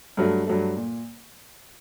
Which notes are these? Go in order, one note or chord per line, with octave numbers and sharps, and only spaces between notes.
G2 F#3 A3
G2 F#3 A3
A#2